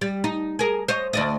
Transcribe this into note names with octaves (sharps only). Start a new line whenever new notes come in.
G3
D#4
G#4 A#4
C5 C#5 D#5
D2 D5 D#5